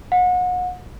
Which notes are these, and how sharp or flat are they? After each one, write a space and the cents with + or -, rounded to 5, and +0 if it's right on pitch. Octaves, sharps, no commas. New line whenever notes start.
F#5 -35